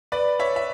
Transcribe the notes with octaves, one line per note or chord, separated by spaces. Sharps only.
B4 D5
C#5 E5
E5